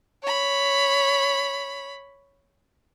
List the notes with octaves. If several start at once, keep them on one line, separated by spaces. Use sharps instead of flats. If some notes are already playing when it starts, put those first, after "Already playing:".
C#5 B5